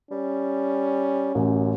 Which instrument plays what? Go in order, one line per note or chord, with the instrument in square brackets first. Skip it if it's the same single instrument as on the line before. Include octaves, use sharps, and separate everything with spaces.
[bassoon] G3 [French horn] C#4
[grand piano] A1 [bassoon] F#2